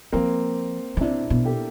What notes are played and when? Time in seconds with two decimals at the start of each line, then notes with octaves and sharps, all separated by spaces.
0.13 F3 A#3 C4
0.97 C#3
1.01 C3 D4 E4
1.30 B2
1.45 G4 A4